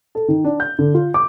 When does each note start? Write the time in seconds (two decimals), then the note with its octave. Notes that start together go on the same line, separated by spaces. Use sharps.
0.15 A4
0.28 D#3
0.44 D4
0.60 G6
0.79 D3
0.94 F4
1.14 D6